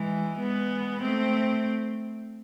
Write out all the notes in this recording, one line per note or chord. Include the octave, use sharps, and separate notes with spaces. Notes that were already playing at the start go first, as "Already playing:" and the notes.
Already playing: E3 G#3
G#3 B3
A3 C4